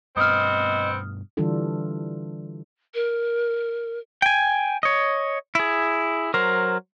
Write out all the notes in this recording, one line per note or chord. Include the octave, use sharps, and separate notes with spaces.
G2 B2 B3 C4 D#5 D#6 F6
D3 E3 G3 D4 F4 A4
A#4
G5 G#5
C#5 D#5
E4 G#4
F#3 A#4 C5